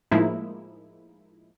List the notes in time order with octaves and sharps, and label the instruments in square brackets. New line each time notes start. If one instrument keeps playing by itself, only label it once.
[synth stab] A2 F3 G#3 A#3 D#4 E4